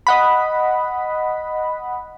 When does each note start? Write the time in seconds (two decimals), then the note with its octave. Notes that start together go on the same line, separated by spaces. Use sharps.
0.07 D#5 F#5 B5